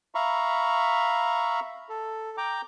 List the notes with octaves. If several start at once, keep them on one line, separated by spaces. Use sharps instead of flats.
E5 F5 A#5 B5 C#6
A4
G5 A#5 D6